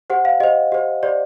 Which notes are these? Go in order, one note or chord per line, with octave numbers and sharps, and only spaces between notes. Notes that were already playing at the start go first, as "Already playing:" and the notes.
G4 C5 F#5
F5
G4 C5 D#5
G4 C5
G4 C5 D5